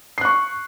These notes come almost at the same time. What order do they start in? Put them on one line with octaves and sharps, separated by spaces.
C7 F#6 C#6